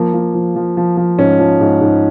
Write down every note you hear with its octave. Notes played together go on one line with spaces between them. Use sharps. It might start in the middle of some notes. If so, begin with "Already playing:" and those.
Already playing: F3 A#3
F3
F3
F3
F3
F3
G#2 C#4
F3
G#2
G#2